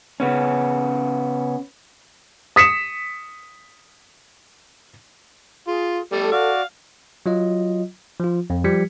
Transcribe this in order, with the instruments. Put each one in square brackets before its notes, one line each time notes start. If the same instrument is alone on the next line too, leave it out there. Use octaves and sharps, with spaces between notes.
[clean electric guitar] C#3 B3 C#4
[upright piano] D#6 B6 C#7 E7
[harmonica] F4 [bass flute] G#4
[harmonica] G3 A3 [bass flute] A4
[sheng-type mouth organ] F#4 D5 [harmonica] F5
[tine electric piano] F#3 F4 D#5
F3 F4
F2
F3 G3 G4 G#6 B6 C#7